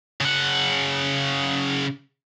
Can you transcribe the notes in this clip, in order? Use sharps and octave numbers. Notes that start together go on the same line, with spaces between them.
C#3 F#5